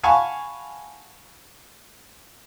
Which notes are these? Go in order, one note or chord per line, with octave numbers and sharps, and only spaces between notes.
F5 F#5 G#5 A5 B5 C#6